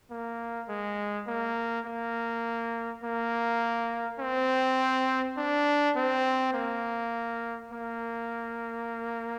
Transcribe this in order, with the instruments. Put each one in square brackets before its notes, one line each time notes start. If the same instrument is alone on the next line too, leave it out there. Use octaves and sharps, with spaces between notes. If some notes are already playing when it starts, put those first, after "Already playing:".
[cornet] A#3
G#3
A#3
A#3
A#3
C4
D4
C4
A#3
A#3